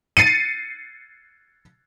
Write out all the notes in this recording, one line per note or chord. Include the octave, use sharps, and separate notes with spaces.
A6 C7 C#7 D#7